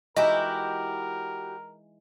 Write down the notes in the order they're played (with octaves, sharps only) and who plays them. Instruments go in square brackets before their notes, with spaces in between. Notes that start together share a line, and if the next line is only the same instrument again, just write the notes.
[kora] E3 G#3 D#4 [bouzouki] E4 F#4 G4 [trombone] A#4 [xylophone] D#5